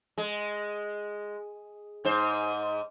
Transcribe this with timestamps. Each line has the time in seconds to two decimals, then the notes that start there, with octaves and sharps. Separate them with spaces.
0.18 G#3
2.05 G#2 C5